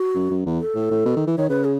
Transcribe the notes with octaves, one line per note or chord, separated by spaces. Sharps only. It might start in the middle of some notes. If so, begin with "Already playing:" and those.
Already playing: F#4
F#2
F#2
E2
A4
A2
A2
B2
D#3
E3
D#3 C#5
C#3 B4
G#4